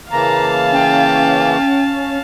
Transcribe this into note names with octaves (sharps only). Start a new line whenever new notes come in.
C#3 E3 A#3 F5 A5 A#5
C#4 G5